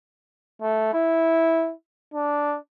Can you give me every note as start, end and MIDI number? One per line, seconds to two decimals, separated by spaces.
0.62 0.89 57
0.94 1.72 64
2.14 2.57 62